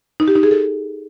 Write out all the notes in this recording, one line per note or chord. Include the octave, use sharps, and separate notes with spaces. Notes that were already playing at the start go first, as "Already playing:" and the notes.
D#4
G4
D#4
G#4
A4